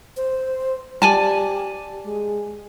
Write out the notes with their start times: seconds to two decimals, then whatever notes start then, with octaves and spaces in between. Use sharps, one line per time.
0.17 C5
1.02 G4 D5 G#5 A5
2.04 G#3